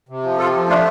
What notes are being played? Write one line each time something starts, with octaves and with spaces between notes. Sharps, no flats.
C3
F3
C3 F4 A4
F3
A3 D4 F4